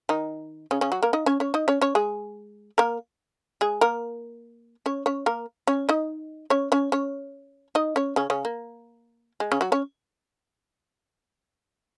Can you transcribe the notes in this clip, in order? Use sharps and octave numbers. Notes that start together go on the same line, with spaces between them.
D#3 D#4
C#3 C#4
C#3 C#4
F#3 F#4
A#3 A#4
D#4 D#5
C#4 C#5
C#4 C#5
D#4 D#5
C#4 C#5
C#4 C#5
G#3 G#4
A#3 A#4
G#3 G#4
A#3 A#4
C#4 C#5
C#4 C#5
A#3 A#4
C#4 C#5
D#4 D#5
C#4 C#5
C#4 C#5
C#4 C#5
D#4 D#5
C#4 C#5
C#3 C#4
C#3 C#4
A#3
G#3
C#3 C#4
F#3 F#4
C#4 C#5